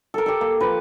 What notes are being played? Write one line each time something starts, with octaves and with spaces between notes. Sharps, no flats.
A4 A#4
G4 A4
A#3
F3 B4